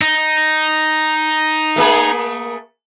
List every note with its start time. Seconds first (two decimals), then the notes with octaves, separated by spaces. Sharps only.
0.01 D#4
1.76 A3 A#3 G#4